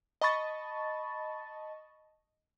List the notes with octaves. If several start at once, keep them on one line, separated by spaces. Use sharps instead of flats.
D#5 A5 B5 C#6 A6